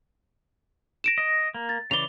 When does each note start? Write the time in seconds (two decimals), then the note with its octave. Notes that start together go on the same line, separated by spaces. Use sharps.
1.04 A#6 D7 E7
1.18 D#5
1.54 A#3
1.69 A6
1.91 C#3 E3 D5 F7 G7